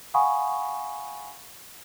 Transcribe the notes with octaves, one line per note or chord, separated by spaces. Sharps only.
F5 F#5 G#5 B5 C#6 D#6